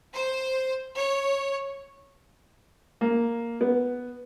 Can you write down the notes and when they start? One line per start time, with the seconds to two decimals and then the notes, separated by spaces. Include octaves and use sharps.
0.13 C5
0.96 C#5
3.01 A#3
3.61 B3